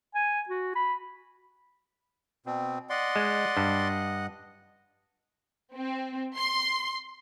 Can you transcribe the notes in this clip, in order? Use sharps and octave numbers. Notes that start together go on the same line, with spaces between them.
G#5
F#4
B5
B2 C4
D5 D#5 F#5 C6
G#3
G2
C4
C6